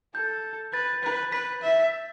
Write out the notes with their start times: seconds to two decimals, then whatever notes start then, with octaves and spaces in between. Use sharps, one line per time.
0.15 A4 G6
0.73 B4 A6
1.03 B4
1.32 B4 B6
1.62 E5